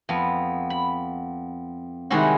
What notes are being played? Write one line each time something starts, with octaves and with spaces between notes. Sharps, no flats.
F2 B3
B5
C3 D#3 G3 G#3 E4 F#4